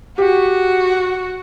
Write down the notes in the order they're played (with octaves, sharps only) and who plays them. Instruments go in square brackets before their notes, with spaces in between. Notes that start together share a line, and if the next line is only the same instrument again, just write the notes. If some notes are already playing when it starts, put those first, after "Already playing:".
[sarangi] F#4 [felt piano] G4